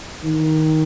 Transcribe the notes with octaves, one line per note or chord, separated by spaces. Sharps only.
D#3